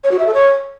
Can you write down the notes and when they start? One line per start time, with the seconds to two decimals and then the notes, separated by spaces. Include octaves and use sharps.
0.04 C#5
0.11 F#4
0.19 E5
0.27 A4
0.34 C#5